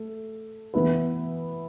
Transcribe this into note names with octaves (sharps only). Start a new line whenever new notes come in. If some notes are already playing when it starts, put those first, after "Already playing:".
Already playing: A3
E3 B3 E4 B4